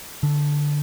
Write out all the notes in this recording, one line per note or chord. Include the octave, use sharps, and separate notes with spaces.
D3